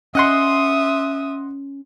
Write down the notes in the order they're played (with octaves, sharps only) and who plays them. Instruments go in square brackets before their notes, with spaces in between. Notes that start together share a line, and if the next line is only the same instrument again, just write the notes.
[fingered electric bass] C#4 [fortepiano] D#5 F#5 C6 [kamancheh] E5 D#6